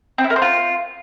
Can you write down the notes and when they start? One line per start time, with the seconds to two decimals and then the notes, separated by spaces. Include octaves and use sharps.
0.18 C4
0.24 E4
0.30 A#4
0.36 C5
0.42 F4